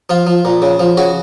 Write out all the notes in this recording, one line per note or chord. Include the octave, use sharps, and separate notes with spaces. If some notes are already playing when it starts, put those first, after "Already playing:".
F3 F4
F3
A#2
C#3
F3
C#3 F#4